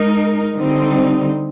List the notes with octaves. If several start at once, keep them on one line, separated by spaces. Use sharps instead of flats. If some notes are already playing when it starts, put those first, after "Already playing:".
Already playing: G#3 D#4 A#4
D3 G3 C4 D#4